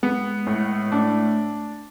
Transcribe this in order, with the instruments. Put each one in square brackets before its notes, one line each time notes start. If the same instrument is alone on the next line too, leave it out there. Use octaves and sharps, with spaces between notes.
[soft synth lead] G#3 [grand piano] B3
[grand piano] A2
[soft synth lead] A3 [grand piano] D4